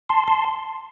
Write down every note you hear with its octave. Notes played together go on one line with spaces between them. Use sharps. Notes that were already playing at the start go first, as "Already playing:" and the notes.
A5 C6
A5 C6